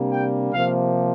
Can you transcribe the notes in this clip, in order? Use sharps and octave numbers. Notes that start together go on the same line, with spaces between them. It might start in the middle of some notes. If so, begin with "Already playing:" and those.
Already playing: C3 G3 A#3 D4
G5
C3 F3 A#3 F5